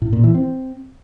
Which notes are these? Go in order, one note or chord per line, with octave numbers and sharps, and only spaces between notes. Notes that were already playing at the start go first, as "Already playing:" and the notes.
A2
A#2
E3
C4